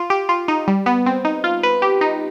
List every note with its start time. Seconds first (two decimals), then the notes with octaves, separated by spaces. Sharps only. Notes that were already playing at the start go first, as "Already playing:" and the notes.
Already playing: F4
0.10 G4
0.29 F4
0.48 D#4
0.68 G3
0.86 B3
1.06 C4
1.25 D#4
1.44 F4
1.63 B4
1.82 G4
2.01 D#4